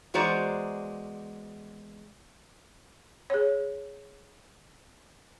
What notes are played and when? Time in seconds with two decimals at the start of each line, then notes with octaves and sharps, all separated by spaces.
0.14 E2 G#3 F#4 C5 D5 A#5
3.30 G#4 C#5